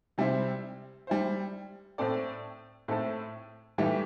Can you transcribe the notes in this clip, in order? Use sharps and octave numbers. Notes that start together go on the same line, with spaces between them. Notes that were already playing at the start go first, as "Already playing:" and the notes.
C3 G3 E4 C5
G3 E4 C5
A2 A3 C4 A4 D5
A2 A3 C4 E4 A4
A2 E3 G3 E4 G4